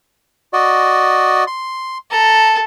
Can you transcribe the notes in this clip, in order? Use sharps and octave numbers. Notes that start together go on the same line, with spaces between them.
F#4 D5 D#5
C6
A4 A#5